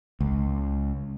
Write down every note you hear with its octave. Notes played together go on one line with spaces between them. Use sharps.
C#2